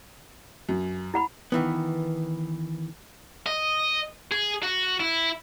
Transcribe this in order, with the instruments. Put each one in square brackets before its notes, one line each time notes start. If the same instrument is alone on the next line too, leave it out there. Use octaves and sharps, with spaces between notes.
[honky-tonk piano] F#2
[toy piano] E4 F#5 B5
[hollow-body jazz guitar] D#3 E3 B3
[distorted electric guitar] D#5
G#4
F#4
E4